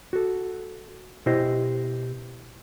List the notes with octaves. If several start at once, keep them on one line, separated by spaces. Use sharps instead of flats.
F#4 A4
B2 E4 G4 C5 D#5